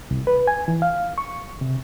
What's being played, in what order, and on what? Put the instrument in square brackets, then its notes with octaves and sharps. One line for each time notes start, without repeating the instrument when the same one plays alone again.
[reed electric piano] C2
B4
G#5
E3
F5
C#6
C3